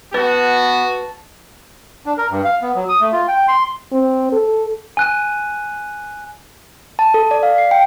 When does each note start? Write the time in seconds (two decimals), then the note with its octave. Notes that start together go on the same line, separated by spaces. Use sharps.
0.14 B3 F#4 B4 A5
2.06 D4
2.18 A#4
2.30 G2
2.45 F5
2.62 B3
2.75 F#3
2.89 D#6
3.00 A3
3.12 F4
3.28 G5
3.48 C6
3.92 C4
4.32 A4
4.97 G#5 F#6 D#7
6.99 A5
7.14 A4
7.31 D5
7.43 F5
7.58 C7
7.71 G5